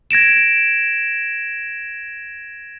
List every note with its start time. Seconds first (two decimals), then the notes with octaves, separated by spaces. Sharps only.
0.11 G#6 A#6 D7 E7